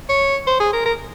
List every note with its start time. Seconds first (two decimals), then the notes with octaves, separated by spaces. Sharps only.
0.09 C#5
0.47 C5
0.60 G#4
0.73 A#4
0.86 A#4